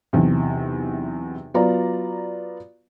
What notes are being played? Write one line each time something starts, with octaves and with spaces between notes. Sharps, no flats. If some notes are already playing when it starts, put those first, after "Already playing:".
B1 E2 C3
F#3 B3 F4 D5 A#5